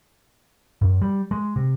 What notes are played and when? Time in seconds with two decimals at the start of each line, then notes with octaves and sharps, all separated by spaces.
0.82 F#2
1.02 G3
1.31 G#3
1.56 C3